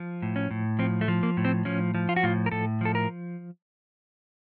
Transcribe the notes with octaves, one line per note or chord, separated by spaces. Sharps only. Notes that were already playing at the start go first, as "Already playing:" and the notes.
Already playing: F3
A2
C#4
A2
F3 C4
A3
F3
A#3
A2
C4
F3 C#4
F3
F4
F#4
A2 F4
A#4
A2 A4
F3 A4
A#4